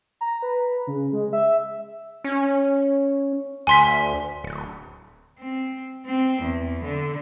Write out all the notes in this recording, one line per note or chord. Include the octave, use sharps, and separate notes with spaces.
A#5
B4
C#3
G#3
E5
C#4
D2 G#5 C6 B6
D1
C4
C4
E2
D3